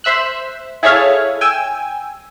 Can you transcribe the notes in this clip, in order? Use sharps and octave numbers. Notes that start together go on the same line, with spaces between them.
C5 E5 E6 F#6
E4 G#4 A4 C#5 E5 F5
G5 G#5 E6